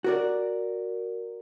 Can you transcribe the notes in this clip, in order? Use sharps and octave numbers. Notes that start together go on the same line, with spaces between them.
F#4 A#4 D5